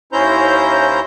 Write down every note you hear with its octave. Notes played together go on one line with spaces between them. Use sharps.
D#2 C#4 E4 C5 A#5 G6